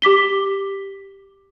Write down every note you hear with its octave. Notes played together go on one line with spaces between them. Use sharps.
G4 D6 B6 G7